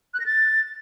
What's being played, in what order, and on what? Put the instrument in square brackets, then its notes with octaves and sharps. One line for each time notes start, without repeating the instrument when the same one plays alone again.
[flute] F#6
A#6
A6